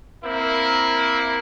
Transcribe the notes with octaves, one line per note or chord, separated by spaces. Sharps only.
A#3 C4 E4